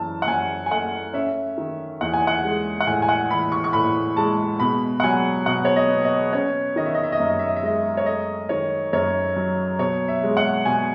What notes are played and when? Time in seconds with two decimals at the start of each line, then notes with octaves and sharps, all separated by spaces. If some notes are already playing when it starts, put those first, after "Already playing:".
Already playing: F#2 E3 A5
0.22 F#5
0.27 F#2 G#5
0.66 G#5
0.71 A3 F#5
1.13 C#4 E5
1.58 D#3
2.01 E2 F#5
2.14 G#5
2.27 F#5
2.44 G#3
2.81 F#5
2.87 A2 G#5
3.02 G#5
3.09 F#5
3.31 E3 B5
3.52 C#6
3.64 C#6
3.73 A2 B5
4.17 G#3 A5
4.60 B2 B5
5.00 F#5
5.03 F#3 G#5
5.46 B2 F#5
5.65 C#5
5.76 D#5
5.90 B3
6.04 D#5
6.33 C#4 C#5
6.76 D#3 D#5
6.86 E5
6.95 D#5
7.04 E5
7.12 D#5
7.20 F#2 E5
7.30 D#5
7.39 E5
7.48 D#5
7.56 E5
7.63 G#3 D#5
7.97 C#5
8.06 A3 D#5
8.49 D#3 C#5
8.93 F#2 C#5
9.36 F#3
9.79 B2 C#5
10.08 E5
10.23 G#3
10.37 F#5
10.65 B2 G#5